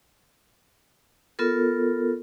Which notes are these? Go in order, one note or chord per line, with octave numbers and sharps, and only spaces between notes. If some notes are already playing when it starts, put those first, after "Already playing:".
B3 F4 A4 A#4